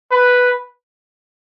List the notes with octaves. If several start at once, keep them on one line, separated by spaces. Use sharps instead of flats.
B4